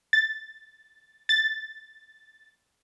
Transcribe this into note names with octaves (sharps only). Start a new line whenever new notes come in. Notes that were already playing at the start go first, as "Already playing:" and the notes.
A6
A6